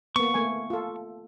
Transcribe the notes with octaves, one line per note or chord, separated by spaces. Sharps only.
A#3 B3 C#6
A3 A#3 G#5
F4 A4